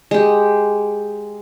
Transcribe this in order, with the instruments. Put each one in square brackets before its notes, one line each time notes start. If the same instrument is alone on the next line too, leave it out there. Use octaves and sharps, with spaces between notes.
[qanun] G#3 G4